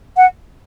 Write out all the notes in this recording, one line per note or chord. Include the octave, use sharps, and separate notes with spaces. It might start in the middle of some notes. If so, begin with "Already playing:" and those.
F#5